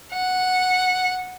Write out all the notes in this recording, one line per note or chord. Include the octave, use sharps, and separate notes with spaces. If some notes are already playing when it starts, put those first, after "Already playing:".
F#5